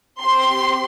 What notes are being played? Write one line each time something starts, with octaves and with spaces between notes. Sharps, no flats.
C4 G4 C6